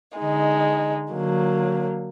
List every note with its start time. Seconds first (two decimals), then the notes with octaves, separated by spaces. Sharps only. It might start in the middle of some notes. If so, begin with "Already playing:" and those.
0.17 D3 G#3 D#4
1.11 D3 F#3 A#3